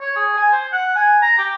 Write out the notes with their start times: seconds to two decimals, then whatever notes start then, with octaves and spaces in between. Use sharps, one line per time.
0.01 C#5
0.16 G#4
0.37 G#5
0.52 C5
0.72 F#5
0.95 G#5
1.22 A#5
1.38 G4